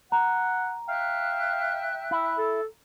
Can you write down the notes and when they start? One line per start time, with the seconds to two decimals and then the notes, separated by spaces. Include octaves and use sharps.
0.12 F#5 A#5
0.89 E5 F5 G5 F#6
2.11 E4
2.38 A4